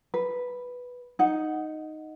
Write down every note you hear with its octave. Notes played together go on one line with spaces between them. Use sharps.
B4
D#4 F#5